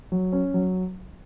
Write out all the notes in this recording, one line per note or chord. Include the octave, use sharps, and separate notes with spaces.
F#3
C#4
F#3